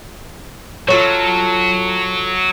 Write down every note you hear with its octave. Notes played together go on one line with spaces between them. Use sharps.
F#3 F4 A4 C#5